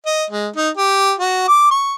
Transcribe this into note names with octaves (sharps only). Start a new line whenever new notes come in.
D#5
G#3
D#4
G4
F#4
D6
C#6